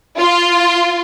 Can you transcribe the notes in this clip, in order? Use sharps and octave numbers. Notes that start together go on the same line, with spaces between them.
F4